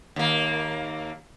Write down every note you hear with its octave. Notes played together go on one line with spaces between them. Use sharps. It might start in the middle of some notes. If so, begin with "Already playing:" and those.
D#2 A#3